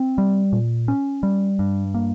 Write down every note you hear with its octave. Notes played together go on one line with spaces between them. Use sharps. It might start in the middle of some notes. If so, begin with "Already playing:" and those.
Already playing: C4
G3
A#2
C#4
G3
G2
A#3